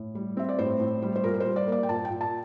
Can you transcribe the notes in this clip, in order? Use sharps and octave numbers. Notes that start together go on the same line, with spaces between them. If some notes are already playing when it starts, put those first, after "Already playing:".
Already playing: A2
G3
C4 E5
D5
A2 C5
A2
G3
C5
A#2 A#4
A#4
G3 C5
D5
A#3 D5
G5
A#2 A5
G5
A#2
A5